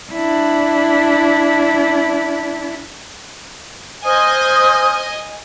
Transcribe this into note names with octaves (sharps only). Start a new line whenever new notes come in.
D4 E4
C5 D#5 G#5 D#6 F6